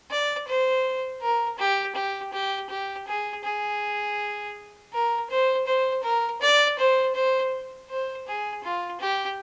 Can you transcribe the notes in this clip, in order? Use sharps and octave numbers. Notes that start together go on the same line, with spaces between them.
D5
C5
A#4
G4
G4
G4
G4
G#4
G#4
A#4
C5
C5
A#4
D5
C5
C5
C5
G#4
F4
G4